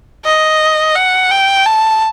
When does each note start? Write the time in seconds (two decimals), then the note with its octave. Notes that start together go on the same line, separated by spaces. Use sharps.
0.25 D#5
0.95 F#5
1.31 G5
1.66 A5